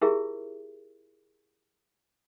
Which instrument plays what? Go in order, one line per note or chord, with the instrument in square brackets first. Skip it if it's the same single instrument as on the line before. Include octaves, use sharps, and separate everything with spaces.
[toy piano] E4 F4 G4 G#4 A#4 E5